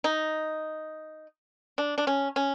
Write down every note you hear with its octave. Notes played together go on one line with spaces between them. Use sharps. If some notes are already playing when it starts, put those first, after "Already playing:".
D#4
D4
D4
C#4
C#4